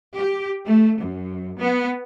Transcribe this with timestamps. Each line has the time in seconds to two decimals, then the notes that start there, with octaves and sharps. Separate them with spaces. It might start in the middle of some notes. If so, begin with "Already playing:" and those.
0.15 G4
0.64 A3
0.98 F#2
1.58 B3